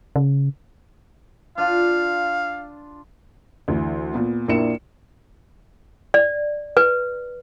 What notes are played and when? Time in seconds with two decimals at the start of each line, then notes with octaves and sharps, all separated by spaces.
0.16 C#3
1.58 D4 F4 F5
3.68 D2 E3
4.14 A#2 B3
4.48 A#1 A#3 D4 E4 C#7 E7
6.14 D5
6.77 B4